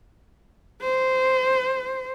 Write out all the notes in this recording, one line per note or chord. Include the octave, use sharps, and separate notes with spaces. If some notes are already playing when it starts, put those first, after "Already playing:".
C5